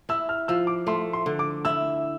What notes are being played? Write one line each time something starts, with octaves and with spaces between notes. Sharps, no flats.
E4 E6
F6
F3 E6
D6
A3 C6
C6
D3
D6
E4 E6